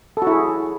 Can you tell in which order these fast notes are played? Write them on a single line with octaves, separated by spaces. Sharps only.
A4 F#4 E4 G#4